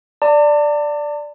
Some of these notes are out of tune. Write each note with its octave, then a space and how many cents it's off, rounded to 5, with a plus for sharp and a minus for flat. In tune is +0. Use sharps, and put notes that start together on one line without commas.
D5 +0 A5 +40